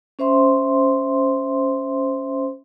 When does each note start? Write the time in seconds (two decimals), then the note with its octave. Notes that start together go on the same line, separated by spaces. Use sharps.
0.19 C#4 C5 E5 C6